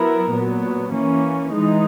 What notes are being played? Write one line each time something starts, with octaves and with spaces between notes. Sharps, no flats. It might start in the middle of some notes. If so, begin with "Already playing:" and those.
Already playing: F#3 B3 E4 A#4
A#2 F#3 B3
E3 A#3 C#4
E3 G#3 D#4